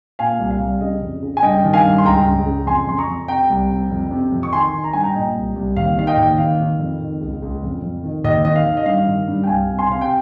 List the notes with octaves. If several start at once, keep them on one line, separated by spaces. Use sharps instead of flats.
A#2 F5 G#5
C2
F5
C2
C#3 D#5
F2
C#3
G#5
G2 D#5 G5
D#3
F5 G#5
G2
C6
C#2 G5 A#5
C#2
C#3
F2 G#5 C6
F2 C6
A#5 C#6
F2
C3 G5 A#5
C2
C3
F2
C3
F2
C#6
D#3 G#5 C6
D#3
A#5
G2 G#5
G5 A#5
A#2 D#5 G5
C2
C2
D#2 F5
D#3 F5
D#5 G5
D#2
D#3 F5
D#3
F2
D#3
C#2
C#2
F2
F2
D#3
D#2 D#5
D#3 D#5
F5
D#3
D#5
G2 F5
D#3
G2
G5
C2 F5 G#5
C3
G#5 C6
C3 F5
G5